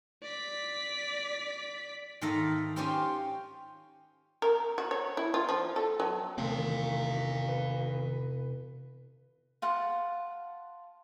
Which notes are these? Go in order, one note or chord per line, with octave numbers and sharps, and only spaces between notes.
D5 B6
G#2 D#3 A4 E5 F5 A#5
C#4 F4 G4 C5 F5 G5
A#4
F#4
C#5
E4
F4
F3
A4
F#3
E1 C3 D#3 A3 C4 D5 F5
B4
F4 F#5 A5